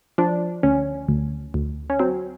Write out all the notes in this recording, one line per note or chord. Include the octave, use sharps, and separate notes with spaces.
F3 D4
D2 C#4
D2
D2
C#4
F#3 C4